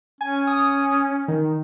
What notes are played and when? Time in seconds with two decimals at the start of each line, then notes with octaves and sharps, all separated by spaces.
0.21 C#4 G#5
0.47 D#6
1.28 D#3